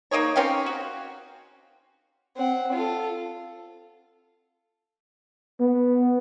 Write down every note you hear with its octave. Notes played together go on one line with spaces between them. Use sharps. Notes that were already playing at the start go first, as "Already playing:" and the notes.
A#3 D#4 G#4 C#5
C4 C#4 G4 F5
F#4
C4 F#5
F4 A4
B3